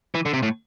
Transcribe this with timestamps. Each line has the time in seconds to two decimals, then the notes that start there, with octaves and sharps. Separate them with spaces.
0.15 E3
0.26 D3
0.34 C3
0.43 A2